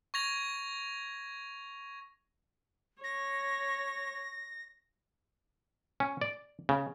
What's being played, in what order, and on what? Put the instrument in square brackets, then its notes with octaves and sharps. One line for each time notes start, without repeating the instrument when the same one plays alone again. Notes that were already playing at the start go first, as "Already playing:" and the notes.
[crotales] C#6 G#6 A#6 F7
[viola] C#5 [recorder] A#6
[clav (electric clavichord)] C#4
D5
C#3